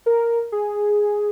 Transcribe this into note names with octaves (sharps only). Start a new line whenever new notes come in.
A#4
G#4